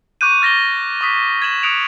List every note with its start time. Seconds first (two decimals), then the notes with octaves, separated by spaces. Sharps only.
0.21 C#6 D6 F#6 G6 D#7
0.42 F6 A6 A#6 D#7 G7
1.01 C#6 D#6 B6
1.42 G#6 A#6 E7 F#7
1.63 D#6 F#6 C#7 D7 F7